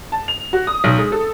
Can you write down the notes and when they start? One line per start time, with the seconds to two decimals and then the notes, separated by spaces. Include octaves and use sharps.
0.12 A5
0.28 F7
0.53 F#4
0.67 D#6
0.84 B1
0.98 G#3
1.12 A4